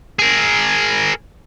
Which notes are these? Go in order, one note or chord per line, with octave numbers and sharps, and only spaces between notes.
G#4 A#4